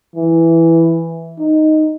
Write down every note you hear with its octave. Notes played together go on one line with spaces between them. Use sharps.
E3
D#4